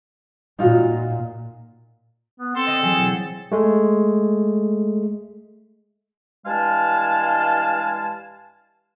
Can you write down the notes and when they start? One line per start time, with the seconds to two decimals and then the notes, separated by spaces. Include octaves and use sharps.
0.59 A#2 D#4 F4 F#4
2.40 B3
2.56 C4 A4 C6
2.67 D3 D#5
2.82 E3 F#3 G#4
2.98 B2
3.52 G#3 A3
6.46 G2 E3 G#3 F5 G#5 A5